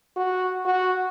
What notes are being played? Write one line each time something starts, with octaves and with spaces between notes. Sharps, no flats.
F#4
F#4